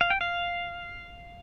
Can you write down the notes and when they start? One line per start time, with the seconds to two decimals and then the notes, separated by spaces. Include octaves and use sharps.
0.01 F5
0.10 G5
0.21 F5